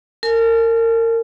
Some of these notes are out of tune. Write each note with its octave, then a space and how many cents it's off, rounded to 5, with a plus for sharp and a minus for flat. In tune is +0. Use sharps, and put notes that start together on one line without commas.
A#4 -30 G#5 +45